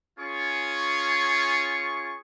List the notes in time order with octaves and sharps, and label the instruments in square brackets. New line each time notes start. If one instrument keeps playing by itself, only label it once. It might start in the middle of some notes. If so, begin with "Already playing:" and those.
[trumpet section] C#4 F4 G#4 C#6